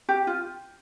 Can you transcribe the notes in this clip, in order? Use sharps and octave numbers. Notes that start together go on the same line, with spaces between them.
G4
F4